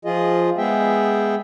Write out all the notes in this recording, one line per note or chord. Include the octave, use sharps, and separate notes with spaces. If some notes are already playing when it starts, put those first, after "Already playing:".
F3 F4 G#4 D#5
G#3 B3 G#4 E5 G5